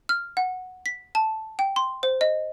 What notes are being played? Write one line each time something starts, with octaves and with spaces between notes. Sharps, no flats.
F6
F#5
B6
A5
G5
C6
C5
D#5